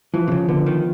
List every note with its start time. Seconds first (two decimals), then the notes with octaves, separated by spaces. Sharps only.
0.13 E3 F3
0.28 C3
0.32 C#3
0.48 D3 B3
0.66 D#3